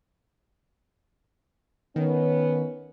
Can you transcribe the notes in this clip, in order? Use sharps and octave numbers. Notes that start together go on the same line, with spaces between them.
D#3 B3 C#4